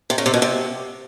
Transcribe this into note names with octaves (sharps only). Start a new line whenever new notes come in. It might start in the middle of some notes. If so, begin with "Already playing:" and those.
C3
C#3
C3
B2
C3